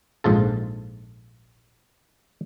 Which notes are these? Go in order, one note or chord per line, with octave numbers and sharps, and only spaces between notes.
A#1 G#2 F4 A4